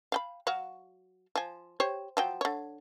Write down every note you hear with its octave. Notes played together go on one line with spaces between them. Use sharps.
F5 G5 B5
F#3 F#4 F5
F3 G#5
G4 C5 C#5
F3 F#3 G5
D3 C#5